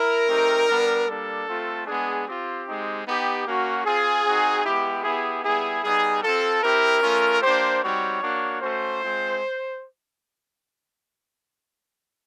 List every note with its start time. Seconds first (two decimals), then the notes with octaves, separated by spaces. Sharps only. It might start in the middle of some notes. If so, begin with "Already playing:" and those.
Already playing: E4 A#4
0.27 A3 C4 D#4 G4
0.67 G3 B3 D4
1.06 G3 A#3 D4 A4
1.46 A3 C4 F4
1.86 G#3 B3 D4 G#4
2.25 C4 F4 G4
2.65 G#3 C4 D#4
3.05 B3 D#4 G4
3.45 A#3 C#4 F#4
3.84 C4 F4 G#4
4.24 C4 D#4 F#4
4.63 G#3 B3 E4 G4
5.03 B3 E4 G4 G#4
5.43 G3 B3 E4 G#4
5.83 G3 B3 D#4 G#4
6.22 C4 F4 A4
6.62 C4 E4 G4 A#4
7.02 A3 C#4 F4
7.41 A#3 D4 G4 C5
7.82 G3 C4 D#4 F#4 C#5
8.21 A#3 D4 F#4
8.61 A3 C#4 F#4 C5
9.00 G#3 C4 F4